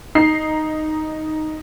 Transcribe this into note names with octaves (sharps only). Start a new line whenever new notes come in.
D#4 C7